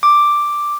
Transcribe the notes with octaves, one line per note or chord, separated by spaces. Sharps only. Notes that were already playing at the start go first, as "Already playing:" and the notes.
D6